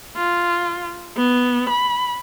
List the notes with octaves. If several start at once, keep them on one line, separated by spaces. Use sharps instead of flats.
F4
B3
B5